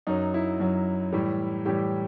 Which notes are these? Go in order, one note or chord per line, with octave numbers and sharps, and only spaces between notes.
F#2 F#3 D#4
E4
F#2 F#3
A2 E3 G3
A2 E3 G3 G4